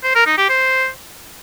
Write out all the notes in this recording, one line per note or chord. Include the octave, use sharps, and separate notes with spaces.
C5
A#4
D#4
G4
C5